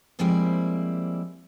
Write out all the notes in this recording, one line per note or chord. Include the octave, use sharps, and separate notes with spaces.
F3 G3 G#3 A#3 C4 E4